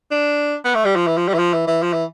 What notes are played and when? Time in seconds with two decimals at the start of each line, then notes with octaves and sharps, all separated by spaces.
0.11 D4
0.64 B3
0.75 A3
0.85 G3
0.96 F3
1.07 E3
1.17 F3
1.28 G3
1.34 E3
1.39 F3
1.54 E3
1.68 E3
1.82 F3
1.93 E3